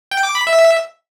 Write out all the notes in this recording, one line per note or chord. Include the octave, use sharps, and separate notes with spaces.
G5
D6
B5
E5